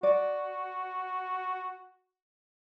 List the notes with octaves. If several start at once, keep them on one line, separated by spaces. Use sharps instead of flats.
F#4 D5